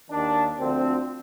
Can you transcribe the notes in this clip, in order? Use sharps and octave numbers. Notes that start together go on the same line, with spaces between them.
D#2 D#3 D4
D2 D3 F3 C4